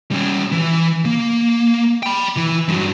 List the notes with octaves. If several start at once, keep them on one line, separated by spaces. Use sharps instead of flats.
G3 C#4
E3
A#3
G5 B5
E3
G2 F#3